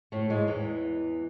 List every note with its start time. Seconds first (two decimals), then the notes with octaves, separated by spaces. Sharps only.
0.12 A2 A3
0.30 G#2 G#3
0.47 E2 E3